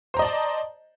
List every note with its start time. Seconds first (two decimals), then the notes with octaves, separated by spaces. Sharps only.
0.14 C5
0.17 A#5
0.19 D#5
0.22 D5
0.25 A5